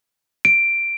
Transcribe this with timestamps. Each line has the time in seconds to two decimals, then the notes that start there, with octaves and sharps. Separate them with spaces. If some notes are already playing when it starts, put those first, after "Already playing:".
0.45 D7